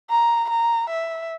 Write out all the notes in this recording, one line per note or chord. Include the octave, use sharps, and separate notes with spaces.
A#5
A#5
E5